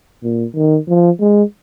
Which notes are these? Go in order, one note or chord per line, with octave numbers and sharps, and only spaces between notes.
A#2
D#3
F3
G#3